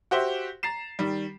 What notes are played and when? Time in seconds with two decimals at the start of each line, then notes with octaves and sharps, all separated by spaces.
0.11 F#4 G4 C5 E5
0.63 A#5 A6 C7 E7
0.99 D#3 G3